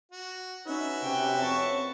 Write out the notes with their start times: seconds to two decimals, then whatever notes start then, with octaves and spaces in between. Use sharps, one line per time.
0.12 F#4
0.67 C#4 D#4 F#4 B4 E5
1.03 C3 C#4 G5
1.41 F2 C4 C#5 A5 C#6